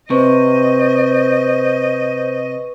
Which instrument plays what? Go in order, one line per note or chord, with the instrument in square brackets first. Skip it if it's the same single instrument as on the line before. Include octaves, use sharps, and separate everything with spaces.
[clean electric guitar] C3 [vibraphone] B4 C#6 [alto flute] C5 [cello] D#5